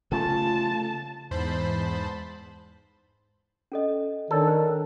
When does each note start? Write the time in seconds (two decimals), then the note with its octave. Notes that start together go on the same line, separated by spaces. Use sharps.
0.12 C#3 A3 F4 A5
1.31 E2 G#2 C5 A5 B5
3.72 C#4 A4 D#5
4.31 D#3 D4 A4 C#5 D5
4.47 C5